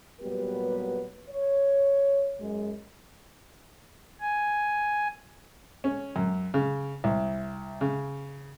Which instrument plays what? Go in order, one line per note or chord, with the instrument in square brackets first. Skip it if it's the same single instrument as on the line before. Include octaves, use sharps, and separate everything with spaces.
[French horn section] A#2 F#3 G3 B3 G4 B4
C#5
F#2 G#3
[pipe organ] G#5
[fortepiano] C#4
F#2
C#3
C2
C#3